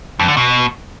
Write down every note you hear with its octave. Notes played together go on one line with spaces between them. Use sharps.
F2
D3
B2